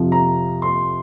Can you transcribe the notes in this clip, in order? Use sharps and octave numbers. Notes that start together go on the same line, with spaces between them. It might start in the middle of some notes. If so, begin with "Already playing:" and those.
Already playing: F2 C3 F3
A#5
C6